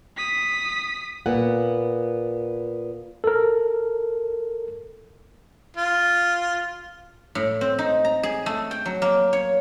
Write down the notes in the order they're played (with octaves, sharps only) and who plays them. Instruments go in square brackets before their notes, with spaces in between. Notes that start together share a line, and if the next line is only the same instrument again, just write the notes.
[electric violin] D#6 B6
[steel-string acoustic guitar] A#2 B3 F#5
[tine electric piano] A4 A#4
[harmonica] F4
[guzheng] A2
C4
D#4
A#5
G#4
A3
G5
F#3
A#3
C#5